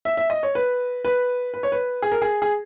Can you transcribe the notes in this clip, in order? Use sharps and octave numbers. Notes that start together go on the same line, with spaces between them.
E5
E5
D#5
C#5
B4
B4
B4
C#5
B4
G#4
A#4
G#4
G#4